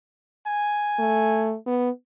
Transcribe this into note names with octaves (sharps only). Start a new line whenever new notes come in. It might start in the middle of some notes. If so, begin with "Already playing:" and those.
G#5
A3
B3